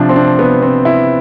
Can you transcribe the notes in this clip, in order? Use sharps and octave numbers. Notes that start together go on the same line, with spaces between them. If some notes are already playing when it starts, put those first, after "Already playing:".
Already playing: C3 F3 D4
C4
D4
B3
C4
E4